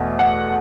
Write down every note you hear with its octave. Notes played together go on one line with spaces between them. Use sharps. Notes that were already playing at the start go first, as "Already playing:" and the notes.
Already playing: E2 B2 A3
F#5